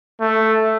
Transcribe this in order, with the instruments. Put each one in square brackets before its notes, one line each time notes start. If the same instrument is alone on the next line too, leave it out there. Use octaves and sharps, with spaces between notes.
[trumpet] A3